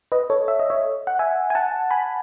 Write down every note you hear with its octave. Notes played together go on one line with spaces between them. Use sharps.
B4 D#5
A4 C#5
E5
D#5
C#5 E5
F#5
E5 G#5
G#5
F#5 A5
G#5 B5